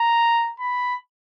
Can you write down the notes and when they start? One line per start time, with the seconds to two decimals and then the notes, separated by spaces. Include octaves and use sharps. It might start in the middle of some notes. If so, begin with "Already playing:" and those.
Already playing: A#5
0.60 B5